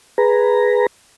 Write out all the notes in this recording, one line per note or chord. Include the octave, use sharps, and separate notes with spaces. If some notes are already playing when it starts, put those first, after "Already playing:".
G#4 B4 A#5